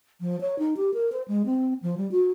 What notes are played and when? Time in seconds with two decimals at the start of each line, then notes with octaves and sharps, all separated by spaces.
0.21 F3
0.41 C#5
0.59 D#4
0.77 G4
0.94 A#4
1.12 C5
1.28 G#3
1.45 C4
1.82 F3
1.97 G3
2.11 F#4